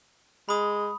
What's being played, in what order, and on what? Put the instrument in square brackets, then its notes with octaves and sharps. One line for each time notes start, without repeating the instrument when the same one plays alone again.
[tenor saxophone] G#3 [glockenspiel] B5 D#6